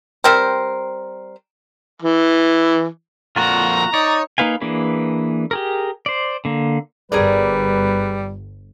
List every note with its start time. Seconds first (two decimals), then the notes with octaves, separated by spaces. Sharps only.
0.24 G3 C4 A#4 C5
2.02 E3
3.36 F2 A#2 F4 F#4 F#5 A#5
3.94 D#4 C#5 D5
4.38 A#3 D#4 B4 F5 G#5
4.61 E3 A#3 D4 G#4 B4
5.51 G4 G#4 A#4
6.06 C5 D5
6.45 D3 A#3
7.12 G1 G3 G#4 A#4 B4 D5